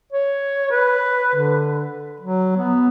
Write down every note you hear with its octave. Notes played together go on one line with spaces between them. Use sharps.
C#5
B4
D3
F#3
B3